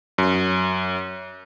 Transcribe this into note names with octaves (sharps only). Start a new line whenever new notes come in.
F#2